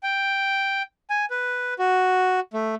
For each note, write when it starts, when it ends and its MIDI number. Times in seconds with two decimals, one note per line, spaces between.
0.03 0.82 79
1.10 1.25 80
1.30 1.74 71
1.79 2.40 66
2.53 2.75 57